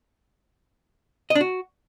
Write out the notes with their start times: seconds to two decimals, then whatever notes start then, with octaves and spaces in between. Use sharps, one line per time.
1.30 D#5
1.35 D4
1.41 F#4